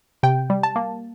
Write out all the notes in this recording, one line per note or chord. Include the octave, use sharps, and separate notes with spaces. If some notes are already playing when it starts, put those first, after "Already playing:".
C3 G5
G3
A5
A#3